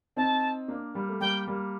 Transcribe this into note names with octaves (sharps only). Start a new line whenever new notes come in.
C4 D#4 A5
A#3 D4
G3 A#3
A3
G3 A#3 G5
G3 A#3